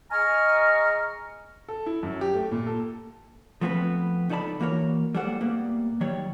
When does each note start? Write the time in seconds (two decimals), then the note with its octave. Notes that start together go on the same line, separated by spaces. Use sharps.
0.11 G#4 D#5 G#5 A#5 C#6 F6
1.68 A4
1.86 E4
2.03 F#2
2.21 G4
2.34 A3
2.52 A#2
2.67 A4
3.61 F3 A3 B3 C4 G#4 B4
4.29 C#2 D#4 A4 D5 A5 B5
4.60 E3 A#3 F#4 A#4 C#5
5.15 G3 G#3 A#3 A4 C5 F#5
5.41 A2 G3 A#3 B3
6.01 D#3 F#3 G3 C#5